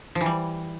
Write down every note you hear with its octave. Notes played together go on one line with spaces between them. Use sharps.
F3
E3
G3